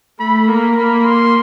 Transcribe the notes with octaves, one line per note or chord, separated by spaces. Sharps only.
A3 B5
A#3 A#5
A#3 B5
C6